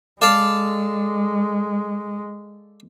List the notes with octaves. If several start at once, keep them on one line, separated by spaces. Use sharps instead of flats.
G#3 A4 D5 F5